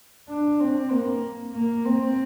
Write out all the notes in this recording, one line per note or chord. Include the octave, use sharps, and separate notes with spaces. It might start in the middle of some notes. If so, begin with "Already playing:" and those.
D4
C4
A#3
A#3
C4